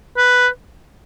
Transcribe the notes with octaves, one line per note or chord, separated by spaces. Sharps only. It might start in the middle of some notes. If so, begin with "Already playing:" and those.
B4